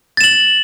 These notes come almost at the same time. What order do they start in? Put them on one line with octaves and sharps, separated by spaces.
A6 E7 F#7